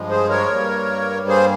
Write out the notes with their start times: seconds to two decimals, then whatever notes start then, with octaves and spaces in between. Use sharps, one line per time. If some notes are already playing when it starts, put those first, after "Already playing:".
Already playing: G2 F3 G#3
0.09 G#4 C5
0.29 A#4 C#5
0.50 G2 G3 A#3
1.28 G#4 C5